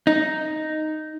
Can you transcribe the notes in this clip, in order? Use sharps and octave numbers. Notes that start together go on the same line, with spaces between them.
D#4